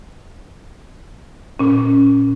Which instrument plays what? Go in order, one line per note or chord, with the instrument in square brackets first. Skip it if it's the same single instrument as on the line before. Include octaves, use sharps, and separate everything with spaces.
[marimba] A#2 C#4